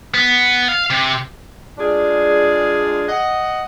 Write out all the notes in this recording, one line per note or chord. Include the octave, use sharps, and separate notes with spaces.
B3
F5
C3
G#3 D4 F4 G#4 D5
D#5 F#5